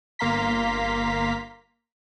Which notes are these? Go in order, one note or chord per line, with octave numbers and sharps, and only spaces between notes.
G1 A#3 F5 A#5 C6 B6